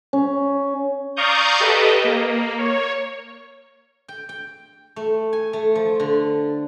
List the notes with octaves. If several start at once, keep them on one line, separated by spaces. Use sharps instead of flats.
C#4
D5 F5 A#5 C#6 D#6 G6
G4 A4 B4 D#5
A#3
C#5
G5
G5
A3
G#5
A3
F3
D3